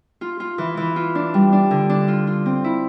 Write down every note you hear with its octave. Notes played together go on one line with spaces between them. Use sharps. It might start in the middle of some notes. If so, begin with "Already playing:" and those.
F4
F4
E3
E3
F4
D4
G3
D4
D3
D4
F4
F4
C4
E4